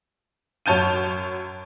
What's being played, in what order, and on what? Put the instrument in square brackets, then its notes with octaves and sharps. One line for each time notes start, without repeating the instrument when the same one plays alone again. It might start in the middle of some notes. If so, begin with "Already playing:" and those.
[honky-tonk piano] F#2 C#5 A5 G6 D#7